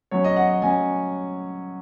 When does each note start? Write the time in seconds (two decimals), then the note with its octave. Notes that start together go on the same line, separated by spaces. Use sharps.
0.11 F#3 C#4 C#5
0.24 D#5
0.36 F#5
0.49 D#5
0.62 F#3 C#4 G#5